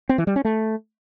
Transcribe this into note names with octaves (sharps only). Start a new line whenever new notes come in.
C4
E3
G3
C#4
A3